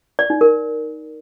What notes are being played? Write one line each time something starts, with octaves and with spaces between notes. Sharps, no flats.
D5
D#4
A#4